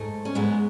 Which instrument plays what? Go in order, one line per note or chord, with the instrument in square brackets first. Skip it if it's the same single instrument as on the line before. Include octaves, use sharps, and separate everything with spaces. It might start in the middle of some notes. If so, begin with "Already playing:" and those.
Already playing: [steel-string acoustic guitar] G#2 F#3 A3
C#4
G#2 F#3 G#3 B3